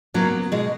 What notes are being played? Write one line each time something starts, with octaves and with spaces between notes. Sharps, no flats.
C#3 F#3 A#3 B3
B2 G#3